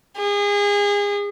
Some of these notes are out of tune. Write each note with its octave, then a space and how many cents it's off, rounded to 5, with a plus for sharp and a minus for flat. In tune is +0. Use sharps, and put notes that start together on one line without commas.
G#4 -30